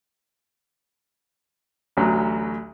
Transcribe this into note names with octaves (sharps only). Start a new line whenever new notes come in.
A1 D2 F#3